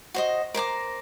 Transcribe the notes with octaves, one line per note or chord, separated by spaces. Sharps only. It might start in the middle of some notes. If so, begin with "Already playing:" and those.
F#4 C5 D#5
A#4 C5 A#5 D6